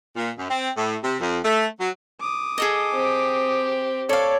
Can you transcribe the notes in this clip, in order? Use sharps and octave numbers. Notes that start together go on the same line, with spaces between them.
A#2
F#2
C4
A2
C3
F2
A3
F#3
D6 D#6
G#4 A4 D#5
C4 G4
A4 C#5 D5 F5